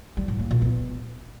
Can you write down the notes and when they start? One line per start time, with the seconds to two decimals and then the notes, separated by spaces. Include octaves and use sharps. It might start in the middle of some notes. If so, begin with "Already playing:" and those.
0.17 G3
0.28 A2
0.39 A#3
0.51 A#2
0.62 B3